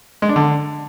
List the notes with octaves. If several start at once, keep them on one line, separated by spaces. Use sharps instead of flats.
G#3
D4
D3